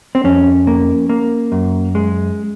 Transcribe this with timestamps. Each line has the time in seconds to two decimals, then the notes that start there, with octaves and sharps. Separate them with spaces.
0.15 C4
0.24 F2 C#4
0.67 A#3
1.09 A#3
1.52 F#2
1.95 G#3